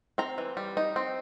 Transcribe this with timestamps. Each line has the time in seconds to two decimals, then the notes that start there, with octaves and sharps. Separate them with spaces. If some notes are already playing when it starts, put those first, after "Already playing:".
0.18 C4 A#5
0.38 E3
0.57 G3
0.77 D#4
0.96 C4